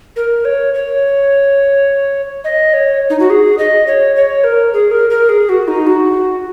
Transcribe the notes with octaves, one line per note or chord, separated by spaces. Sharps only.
A#4
C#5
C#5
D#5
C#5
D#4
F#4
G#4
D#5
C#5
C#5
A#4
G#4
A#4
A#4
G#4
F#4
D#4
F#4